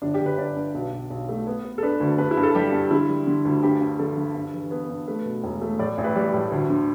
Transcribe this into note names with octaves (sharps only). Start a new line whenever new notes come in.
G1 D4
G4
G1
B4
G2 D5
G2
B1
B1
B1
A3
B3
B3
A4
D4 B4
D2
G2 B4
E4
G2
A4
G3 G4
G2
D3 E4
G3
D3
D2
G2 G4
G2
D3 A4
D3
G2
E3
B3
G2
A3 B4
B2
E1
A3
A2 D5
A1
B4
G3 D5
A2
D2
D3